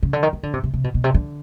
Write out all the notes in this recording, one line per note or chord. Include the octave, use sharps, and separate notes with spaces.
C#3
D3
D#3
D#3
D3
C3
C3
C3
B2
B2
C3
D3